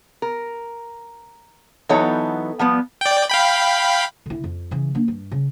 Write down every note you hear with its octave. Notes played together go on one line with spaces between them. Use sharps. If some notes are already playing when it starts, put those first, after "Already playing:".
A#4
E3 F#3 B3 D#4 A4 C#5
F3 G3 B3
D5 G5
F5 G5 B5
D3 E4
F2
C#3 E3
A#3 D4
G2
C#3